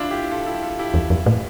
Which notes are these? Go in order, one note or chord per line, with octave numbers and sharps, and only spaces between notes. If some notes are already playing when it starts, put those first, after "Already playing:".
Already playing: D4 E4 F4
E4 G4
F4 A4
E4 G4
F4 A4
E4 G4
E2
F2
A2